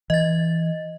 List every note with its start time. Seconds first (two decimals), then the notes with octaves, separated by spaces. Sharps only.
0.10 E3 D#5 A6